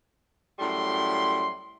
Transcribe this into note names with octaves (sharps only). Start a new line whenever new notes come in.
F#2 A2 G3 C6